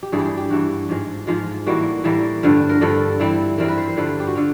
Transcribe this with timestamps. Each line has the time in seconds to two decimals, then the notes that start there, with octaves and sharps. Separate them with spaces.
0.03 G4
0.12 G2 E3 G3 G#4
0.19 G4
0.25 G#4
0.38 G4
0.50 G2 E3 G3 F#4
0.89 G#2 F3 G#3
1.27 G#2 F3 G#3 F4
1.66 A2 E3 G3 A#3 F#4
2.04 A2 E3 G3 A#3
2.43 G2 D3 F3
2.69 A#4
2.81 G2 D3 F3 A4
3.20 E3 G3 C4 E4
3.58 E3 G3 C4 E4 A#4
3.68 B4
3.78 C5
3.88 C5
3.96 G2 D3 F3 B4
4.20 G4
4.27 F#4
4.35 D3 F4